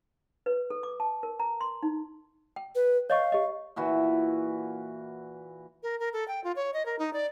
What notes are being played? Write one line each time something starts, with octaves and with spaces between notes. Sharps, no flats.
B4
A4
D6
A5
A#4
A#5
C6
D#4
G5
B4
C#5 D#5 F5 C#6
G4 D#5
A#2 E3 F#4
A#4
A#4
A4
G5
F4
C#5
D#5
A#4
D#4
D5